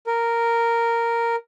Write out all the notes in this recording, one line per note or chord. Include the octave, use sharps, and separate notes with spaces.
A#4